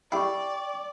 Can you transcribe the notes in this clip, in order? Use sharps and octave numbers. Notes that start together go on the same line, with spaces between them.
E4 G4 D5 G5 C#6